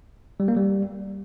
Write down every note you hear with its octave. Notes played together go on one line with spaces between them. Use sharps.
G3
A#3
G3